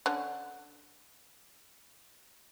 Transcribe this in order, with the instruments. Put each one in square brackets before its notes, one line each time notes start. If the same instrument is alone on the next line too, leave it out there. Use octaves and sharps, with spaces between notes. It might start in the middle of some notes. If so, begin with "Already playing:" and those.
[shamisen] D3 C#4